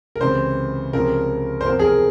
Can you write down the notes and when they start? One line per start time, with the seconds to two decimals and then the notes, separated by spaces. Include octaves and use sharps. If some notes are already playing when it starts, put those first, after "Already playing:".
0.16 A#4
0.21 C#2 C3 E3 C5
0.93 C#2 C3 F3 A#4
1.61 C5
1.66 E2 C3 F3 A#4
1.79 G#4
1.84 A#4